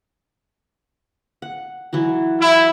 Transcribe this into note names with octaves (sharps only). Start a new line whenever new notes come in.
F#5
E3 F#3 F#4
E4